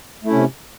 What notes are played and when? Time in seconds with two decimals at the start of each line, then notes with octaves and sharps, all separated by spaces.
0.24 A3
0.27 E4
0.30 C#4
0.33 C3